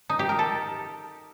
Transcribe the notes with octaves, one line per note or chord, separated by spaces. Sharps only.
D#4
G4
A#4
A4